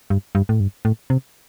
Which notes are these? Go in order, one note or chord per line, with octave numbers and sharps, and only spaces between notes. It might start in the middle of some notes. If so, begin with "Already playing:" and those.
G2
G2
A2
G2
A2
C3